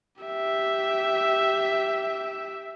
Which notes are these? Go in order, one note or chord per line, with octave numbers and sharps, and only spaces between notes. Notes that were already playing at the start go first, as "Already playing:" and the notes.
G4 E5